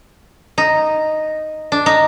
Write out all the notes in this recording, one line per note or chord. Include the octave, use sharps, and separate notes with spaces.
D#4
D4
D#4